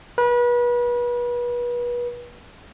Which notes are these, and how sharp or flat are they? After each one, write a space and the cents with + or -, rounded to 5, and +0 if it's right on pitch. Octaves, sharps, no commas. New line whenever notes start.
B4 -35